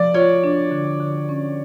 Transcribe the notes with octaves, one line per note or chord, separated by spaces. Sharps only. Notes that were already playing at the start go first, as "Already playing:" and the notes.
Already playing: F3 D5
F4 C#5
D4
D3
D3
C#4